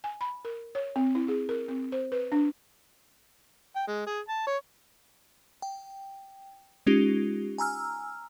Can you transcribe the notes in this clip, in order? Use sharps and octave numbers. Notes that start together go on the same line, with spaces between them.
G#5
B5
A#4
C#5
C4
E4
G#4
A#4
C4
C5
B4
D4
G5
G#3
G#4
A5
C#5
G5
G#3 C#4 D#4 F4 G4
G#5 A#5 E6 F6